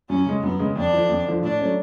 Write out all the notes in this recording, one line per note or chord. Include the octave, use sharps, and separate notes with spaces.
F#2 C#4
C#3 G#3
F#2 B3
C#3 G#3
F2 D4
D3 F3
F2
D3 F3
A2 D4
F#3 A3 C#4